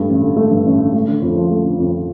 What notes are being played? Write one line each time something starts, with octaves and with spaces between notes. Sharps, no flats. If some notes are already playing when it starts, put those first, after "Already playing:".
Already playing: G2 A3
A1
D3
A3
G2
A1
D3
A3
D3
F2
F3
A3
D3
F2
F3